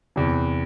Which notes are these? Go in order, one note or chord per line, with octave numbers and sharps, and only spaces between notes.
E2 C3 E3